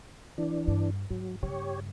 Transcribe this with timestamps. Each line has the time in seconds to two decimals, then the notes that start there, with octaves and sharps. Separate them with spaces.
0.38 E3 D4
0.68 G2
1.10 G#2 F#3
1.43 G2 C#3 G4 C#5